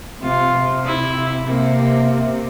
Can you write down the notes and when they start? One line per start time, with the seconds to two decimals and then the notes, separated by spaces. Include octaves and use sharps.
0.22 C3 F4
0.54 C3
0.85 E4
1.46 C3 A#3